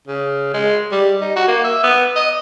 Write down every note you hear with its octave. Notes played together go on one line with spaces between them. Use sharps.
C#3
G#3
G3
D#4
F#4
A#3
E5
B3
D#5